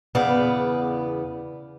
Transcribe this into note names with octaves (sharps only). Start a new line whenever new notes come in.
E2 C#3 B3 D5 F5